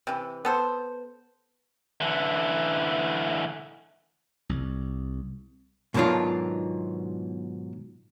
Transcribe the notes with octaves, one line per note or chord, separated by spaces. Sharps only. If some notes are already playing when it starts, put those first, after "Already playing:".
C3 E3
B3 A4 C5
D3 E3
C2
G#2 B2 D#3 F#3 D4 F4